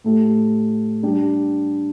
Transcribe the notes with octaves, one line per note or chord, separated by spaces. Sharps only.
A2 A3 G4
G3 D4 G4